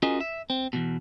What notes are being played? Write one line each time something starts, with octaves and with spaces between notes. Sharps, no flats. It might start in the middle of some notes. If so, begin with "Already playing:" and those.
C#4 F4 F#4 G#4 A#4 D#5
E5
C4
E2 G#2 B2